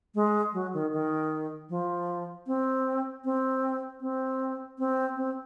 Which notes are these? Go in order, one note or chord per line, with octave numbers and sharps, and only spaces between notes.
G#3
F#3
D#3
D#3
F3
C4
C4
C4
C4
C4